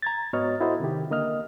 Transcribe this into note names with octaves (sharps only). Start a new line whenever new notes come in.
A#5 G#6 A6
G#2 B3 F#4 C#5 D#5 F6
E4 F#4 A4 C5 D#5
C3 D#3 G4
D3 A#3 D#5 F6